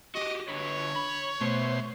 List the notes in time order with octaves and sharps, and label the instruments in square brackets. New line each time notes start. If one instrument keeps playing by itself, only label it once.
[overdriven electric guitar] F#4 G4 [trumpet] D#5
[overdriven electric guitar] D3 B4 [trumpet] C#5
[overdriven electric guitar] B5
[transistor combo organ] B2 C5 [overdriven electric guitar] A3